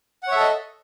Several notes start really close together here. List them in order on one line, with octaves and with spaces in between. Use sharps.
F#5 C#5 E5 A4 D#5